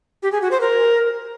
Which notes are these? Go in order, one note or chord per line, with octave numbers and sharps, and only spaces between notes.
G4
G#4
F#4
C5
A#4